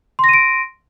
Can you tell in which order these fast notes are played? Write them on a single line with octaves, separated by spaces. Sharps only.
C6 A#6 D#7 D7